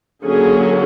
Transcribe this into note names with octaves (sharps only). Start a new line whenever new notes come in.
D3 F#3 A#3 C#4 G#4